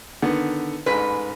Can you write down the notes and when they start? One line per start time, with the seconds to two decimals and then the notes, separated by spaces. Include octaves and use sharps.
0.22 D3 D#3 B3
0.86 A1 G#2 B4